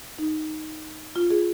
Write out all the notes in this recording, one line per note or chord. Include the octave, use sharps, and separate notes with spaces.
D#4
F4
G#4